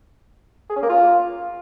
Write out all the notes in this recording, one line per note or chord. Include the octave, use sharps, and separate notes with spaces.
G#4
C#4
A#3
F4